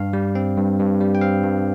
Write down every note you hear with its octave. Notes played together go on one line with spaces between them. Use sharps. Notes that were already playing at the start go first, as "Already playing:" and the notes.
Already playing: G2 F5
G3
C4
G2
G2
G3
G5
C4 F5
G2